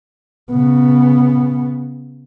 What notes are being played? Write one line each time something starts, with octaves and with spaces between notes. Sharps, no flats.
C#3 B3